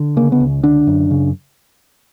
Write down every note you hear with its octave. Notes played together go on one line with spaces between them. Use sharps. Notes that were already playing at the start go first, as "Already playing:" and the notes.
Already playing: D3
C#3 A#3
B3
C#2
D3 D4
F#2
C#3